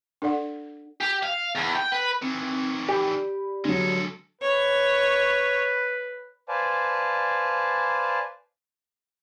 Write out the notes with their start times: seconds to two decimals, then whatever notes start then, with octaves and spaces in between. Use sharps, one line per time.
0.22 D4 A4 D5 F#5
1.01 G4
1.23 F5
1.55 E2
1.76 G5
1.92 B4
2.22 D#3 E3 C4
2.89 G4 D5 B5
3.65 D3 F#3 G#3 A4
4.41 B4 C#5
6.49 B4 C5 D5 F5 G#5 A5